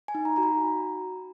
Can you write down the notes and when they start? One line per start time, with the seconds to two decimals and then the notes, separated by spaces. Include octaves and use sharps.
0.08 G#5
0.15 D#4
0.25 A#5
0.36 F#4 A#5
0.43 B5